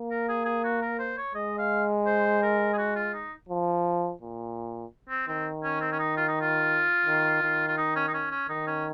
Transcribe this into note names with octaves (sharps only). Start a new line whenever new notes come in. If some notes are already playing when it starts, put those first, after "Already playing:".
Already playing: A#3
A#4
G#4
G#4
F#4
A#4
C5
C#5
G#3 D#5
F5
C5
A#4
G#4
F#4
F4
D#4
F3
A#2
C4
D#3 C4
C#4
C4
C#4
D#4
F4
D#4
F4
D#3
D#3
F4
D#4
C#4
D#4
C#4
C#4
D#3 D#4
C#4